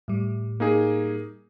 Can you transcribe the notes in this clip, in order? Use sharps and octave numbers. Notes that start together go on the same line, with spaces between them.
A2 G3
A#3 D#4 G#4